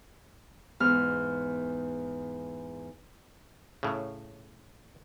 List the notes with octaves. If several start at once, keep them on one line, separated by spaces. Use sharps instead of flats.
E2 G#2 F6
A2 C#3